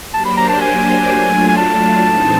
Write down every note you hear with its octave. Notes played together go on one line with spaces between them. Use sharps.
F#3 A#3 D4 G4 C5 A5
B5
A#5
A5
G#5
F#3 A3 D4 F4
G#5
A5
A2 E3 G#3 C4 D#4